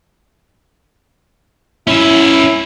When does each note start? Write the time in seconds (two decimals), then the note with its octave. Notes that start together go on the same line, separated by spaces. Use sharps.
1.88 C#4 E4 E5